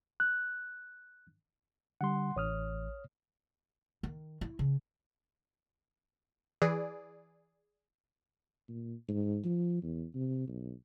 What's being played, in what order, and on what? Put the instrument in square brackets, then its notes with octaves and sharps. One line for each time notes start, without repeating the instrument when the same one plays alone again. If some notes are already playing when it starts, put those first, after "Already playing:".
[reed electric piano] F#6
[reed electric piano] D3 G3 [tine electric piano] F#5 C6
[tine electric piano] A1 [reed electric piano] C#5 D#6 F6
[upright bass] D#3
E4
C#3
[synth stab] E3 G#4 D5
[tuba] A#2
G#2
F3
E2
C3
B1